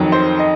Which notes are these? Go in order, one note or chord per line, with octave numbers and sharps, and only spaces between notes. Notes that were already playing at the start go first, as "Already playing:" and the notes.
Already playing: F2 D#3 F#3
C5
D#5